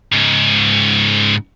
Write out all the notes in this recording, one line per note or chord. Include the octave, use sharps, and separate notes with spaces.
G#2 C#3